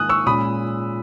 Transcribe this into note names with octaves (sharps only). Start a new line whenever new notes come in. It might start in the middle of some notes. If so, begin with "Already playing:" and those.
Already playing: G#2 D#3 A#3 D#4 G#5 D#6 F#6
C#6 E6
A#2 G#3 C#4 B5 D#6